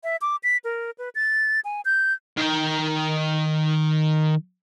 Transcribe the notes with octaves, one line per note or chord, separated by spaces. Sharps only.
E5
D6
B6
A#4
B4
A6
G#5
G6
D#3 G5